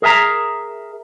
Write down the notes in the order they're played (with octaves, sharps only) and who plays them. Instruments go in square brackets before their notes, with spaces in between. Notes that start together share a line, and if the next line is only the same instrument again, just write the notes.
[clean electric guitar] G#4 A#4 E5 G5 A#5